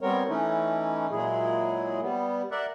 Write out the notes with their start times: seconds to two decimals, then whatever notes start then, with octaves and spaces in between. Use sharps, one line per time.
0.01 G3 B3 C4 A#4 C#5
0.29 E3 A3 C#4 D#4 E4
1.11 A#2 F#3 G#3 E4 G#4
2.02 G3 B3
2.51 A#4 D5 E5 F#5